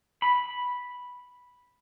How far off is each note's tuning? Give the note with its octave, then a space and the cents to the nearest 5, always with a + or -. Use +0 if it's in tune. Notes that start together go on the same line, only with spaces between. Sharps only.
B5 -5